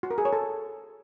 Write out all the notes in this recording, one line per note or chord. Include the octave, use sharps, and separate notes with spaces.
F#4
A#4
G#4
C#5
A4